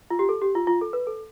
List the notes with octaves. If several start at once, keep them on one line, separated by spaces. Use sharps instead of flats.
F4
G4
A4
G4
F4
F4
A4
B4
A4